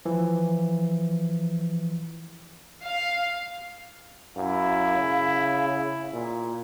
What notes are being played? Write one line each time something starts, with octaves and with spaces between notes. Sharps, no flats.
E3 F3
F5
F#2 E4 F5
C#3
A#2